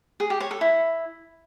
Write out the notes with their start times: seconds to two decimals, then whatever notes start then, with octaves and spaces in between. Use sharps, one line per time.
0.20 G#4
0.30 G4
0.40 C#5
0.51 A4
0.61 E4